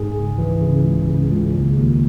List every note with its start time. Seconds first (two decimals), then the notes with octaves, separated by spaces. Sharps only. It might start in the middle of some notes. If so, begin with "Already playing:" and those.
Already playing: G#2 G#4
0.16 C#2
0.38 E3
0.62 C#3
0.85 C#2
1.09 C#3
1.32 C#2
1.55 D#2
1.77 D#2